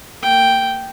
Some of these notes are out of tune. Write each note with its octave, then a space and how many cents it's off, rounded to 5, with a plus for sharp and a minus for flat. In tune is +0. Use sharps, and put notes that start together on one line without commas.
A#3 -30 G5 +0